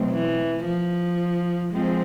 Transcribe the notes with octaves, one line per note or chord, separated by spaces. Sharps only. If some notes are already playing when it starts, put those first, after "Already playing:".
Already playing: B2 F#3 A3 C4
E3
F3
F3 G#3 C4